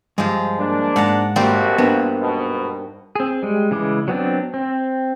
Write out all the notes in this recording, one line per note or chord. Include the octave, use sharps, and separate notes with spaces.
G2 F3 G#3
A#3 D4
G#2 F#5 A5 A#5
A#1 A2 G3 A#3 C4 F#4
G2 B3
G#2 B2
C4 G#4
G3 G#3
C#3 E3 G#3 D6
F#3 B3 C4 D4
C4